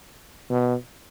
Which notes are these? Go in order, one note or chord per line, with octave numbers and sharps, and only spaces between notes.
B2